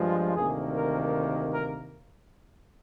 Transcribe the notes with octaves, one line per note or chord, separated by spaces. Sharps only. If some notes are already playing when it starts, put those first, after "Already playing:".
Already playing: G2 F3 G#3
D2 C3 D#3 A#3 G#4
A#4
A#4